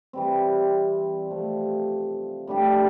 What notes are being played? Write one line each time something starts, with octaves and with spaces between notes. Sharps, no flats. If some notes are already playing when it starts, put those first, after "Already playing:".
E3 G3 C4
C3 F3 A3
A2 G3 D4 G4